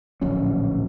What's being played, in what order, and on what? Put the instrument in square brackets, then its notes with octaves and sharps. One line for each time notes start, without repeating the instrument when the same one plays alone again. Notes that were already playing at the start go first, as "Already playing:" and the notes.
[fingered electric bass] D1 A#1 F#3 C#4